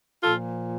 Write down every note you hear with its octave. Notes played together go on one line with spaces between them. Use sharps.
A#2 F3 F4 A4